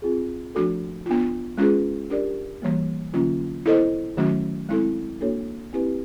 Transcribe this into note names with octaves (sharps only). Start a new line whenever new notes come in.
C4 F4 G#4
F3 A3 D4 F#4 A4
B3 D4 F4
G#3 C#4 F4 G#4 B4
D4 G4 A#4 D5
E3 G3 A#3
D3 F#3 A#3 C#4 F4
B3 E4 A4 C5 D#5
D#3 F#3 A3 C#4 F#4
G#3 C4 E4 A4
A#3 D4 F#4 A4 C#5
C4 E4 G4 B4